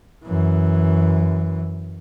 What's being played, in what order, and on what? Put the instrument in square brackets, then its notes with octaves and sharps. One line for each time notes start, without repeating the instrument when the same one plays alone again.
[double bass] F#2 E3